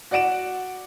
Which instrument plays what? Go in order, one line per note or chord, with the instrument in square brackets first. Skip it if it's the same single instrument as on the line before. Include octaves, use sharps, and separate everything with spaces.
[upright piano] F#4 D5 F#5 D7 E7